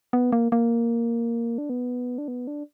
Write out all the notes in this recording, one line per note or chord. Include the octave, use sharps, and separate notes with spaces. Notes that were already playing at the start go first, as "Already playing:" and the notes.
B3
A#3
A#3
D4
B3
D4
B3
D4